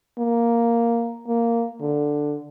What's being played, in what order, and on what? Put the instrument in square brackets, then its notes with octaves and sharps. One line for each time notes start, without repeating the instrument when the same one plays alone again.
[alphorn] A#3
A#3
D3